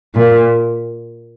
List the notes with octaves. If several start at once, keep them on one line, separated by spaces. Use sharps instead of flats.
A#2